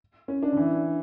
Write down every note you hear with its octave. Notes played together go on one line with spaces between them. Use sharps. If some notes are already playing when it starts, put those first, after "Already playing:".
C#4
D4
D3
E3